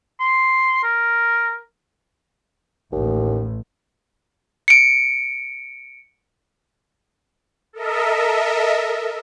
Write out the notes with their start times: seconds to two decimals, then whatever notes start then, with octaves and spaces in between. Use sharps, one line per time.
0.20 C6
0.83 A#4
2.92 A1 D#2
4.68 C#7 D7
7.73 A4 A#4 D#5 E5